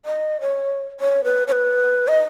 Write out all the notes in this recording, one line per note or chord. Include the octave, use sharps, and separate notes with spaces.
D#5
C#5
C#5
B4
C#5
B4
D#5